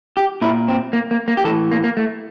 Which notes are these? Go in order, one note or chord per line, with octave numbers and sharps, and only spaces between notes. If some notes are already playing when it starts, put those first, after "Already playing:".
G4
A#2 E4
C4
A#3
A#3
A#3
G4
A2 E3 A4
A#3
A#3
A3